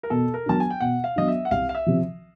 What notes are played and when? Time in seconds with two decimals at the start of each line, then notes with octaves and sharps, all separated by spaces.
0.03 A#4
0.10 B2 A4
0.34 A#4
0.46 F#3 B3 D4 A5
0.60 G#5
0.70 G5
0.81 B2 F#5
1.04 F5
1.16 F#3 B3 D4 D#5
1.28 E5
1.45 F#5
1.51 C2 F5
1.69 F5
1.75 E5
1.86 C3 F3